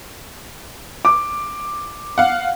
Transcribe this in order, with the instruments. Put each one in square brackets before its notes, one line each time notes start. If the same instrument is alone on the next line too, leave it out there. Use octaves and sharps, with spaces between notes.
[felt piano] D6
[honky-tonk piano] F5 F#5